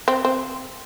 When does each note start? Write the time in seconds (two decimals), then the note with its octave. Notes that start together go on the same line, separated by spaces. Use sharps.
0.08 C4
0.25 C4